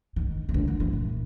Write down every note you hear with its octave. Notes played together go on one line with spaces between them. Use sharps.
D#3
C#3
D3
E3
E3
A#2